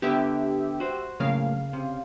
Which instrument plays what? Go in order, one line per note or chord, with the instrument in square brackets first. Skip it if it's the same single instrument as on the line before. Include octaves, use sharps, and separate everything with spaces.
[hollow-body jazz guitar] D3 B3 [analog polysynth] G4 E5
[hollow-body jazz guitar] F#4 C5
[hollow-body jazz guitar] F#2 A2 A#3 [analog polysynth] C#3 F5
[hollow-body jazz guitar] C3